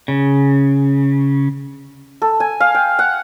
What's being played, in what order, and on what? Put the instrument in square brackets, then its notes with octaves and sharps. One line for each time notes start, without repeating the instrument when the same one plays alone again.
[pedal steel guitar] C#3
[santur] A4
G#5
F5
G5
F#5